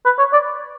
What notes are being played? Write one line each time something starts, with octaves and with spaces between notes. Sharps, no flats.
B4
C#5
D5